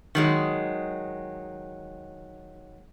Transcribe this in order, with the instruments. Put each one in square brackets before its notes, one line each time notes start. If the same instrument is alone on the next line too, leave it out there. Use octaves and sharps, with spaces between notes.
[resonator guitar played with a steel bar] D#3 F#3 G#3